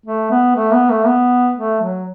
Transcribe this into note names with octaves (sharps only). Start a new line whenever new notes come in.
A3
B3
A3
B3
A3
B3
A3
F#3